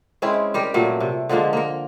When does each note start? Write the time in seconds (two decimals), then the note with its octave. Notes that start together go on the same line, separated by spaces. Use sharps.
0.22 G#3 C4 C#4 E4
0.54 G3 G4 A#4
0.74 A#2 F#3 G3 A3
1.00 C3
1.29 D3 F3 G#3 A#3
1.53 A#3 A#4